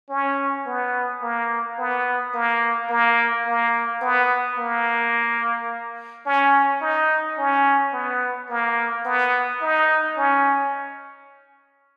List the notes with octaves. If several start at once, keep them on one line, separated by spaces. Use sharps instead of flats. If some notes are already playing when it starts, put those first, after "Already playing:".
C#4
B3
A#3
B3
A#3
A#3
A#3
B3
A#3
C#4
D#4
C#4
B3
A#3
B3
D#4
C#4